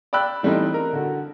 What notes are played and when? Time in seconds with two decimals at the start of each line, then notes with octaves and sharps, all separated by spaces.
0.13 D5 G5 B5 E6 F#6
0.43 E3 G3 A3 C4 D#4
0.74 A#4
0.93 D3 F#4